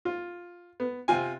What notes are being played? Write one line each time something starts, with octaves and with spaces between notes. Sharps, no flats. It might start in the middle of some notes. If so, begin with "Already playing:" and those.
F4
B3
C3 C4 F4 G#5